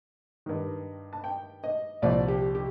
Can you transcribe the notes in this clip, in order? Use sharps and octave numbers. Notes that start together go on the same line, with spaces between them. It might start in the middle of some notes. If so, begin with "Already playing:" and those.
G2 D#3
A5
G5
D#5
C2 A#2 F3 D5
G4
G4